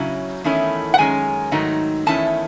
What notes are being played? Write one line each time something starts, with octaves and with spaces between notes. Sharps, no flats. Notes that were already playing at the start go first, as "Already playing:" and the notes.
Already playing: C#3 F#3 C#4 E4
E2 D#3 A3 C#4 E4
F#5
F#2 D#3 G#3 C#4 G#5
G#2 D#3 F#3 A3 D#4
E2 D#3 A3 C#4 E4 A5